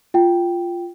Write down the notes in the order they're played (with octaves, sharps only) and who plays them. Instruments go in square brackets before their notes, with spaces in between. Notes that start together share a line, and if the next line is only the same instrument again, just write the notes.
[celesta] F4 G5